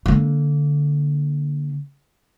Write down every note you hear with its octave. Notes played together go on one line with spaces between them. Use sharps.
D3 A#3